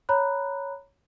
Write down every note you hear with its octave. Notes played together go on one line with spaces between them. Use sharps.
C#5 A#5 B5 F#6